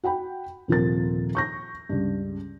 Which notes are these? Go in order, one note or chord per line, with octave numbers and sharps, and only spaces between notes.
F#4 F#5 G5 B5
D#1 C3 F3 F4 A#4 A6
C#6 G6 A#6
C#2 G2